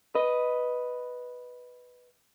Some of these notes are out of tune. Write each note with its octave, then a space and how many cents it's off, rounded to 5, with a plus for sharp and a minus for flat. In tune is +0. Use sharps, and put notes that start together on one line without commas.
B4 +0 D#5 +0